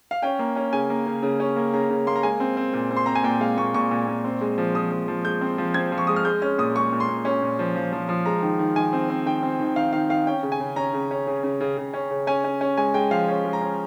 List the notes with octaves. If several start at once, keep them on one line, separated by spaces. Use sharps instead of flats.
F5
C#4 G5
A#3
C#4
C#3 G#5
A#3
C#3
C#3
C#4
A#3
C#3 A#5
C#3
A#3 C6
A#5
G#3 G#5
C4
C4
A#2
C4
C6
C4 A#5
G#5
A#2 G5
G#3 F5
A#2 C#6
A#2 C#6
A#2
A#2
C4
G#3
F3
F3 D#6
F3
F3
G#3 G6
C4
F3
C4 G#6
F3
C#6
G#3 D#6
F6
G#3 G6
C#4 F6
A#2 D#6
G#3 C#6
A#2
C6
A#2
C#4
A#2
F3
F3
F3
F3
G#3 A#5
D#3
D#3
D#3 G#5
C4
C4
D#3 G5
C4
D#3
D#3 F5
D#3 F5
D#3 F5
C#4 G5
C#3
G#5
C#3
C#4 A#5
C#3
C#4
C#3
C#3
C#3
C#3
C#4
C#3
C#4 G#5
C#4
C#4
G#3 G#5
G#3 G5
F3 F5
C#4
G#3
A#5
C#4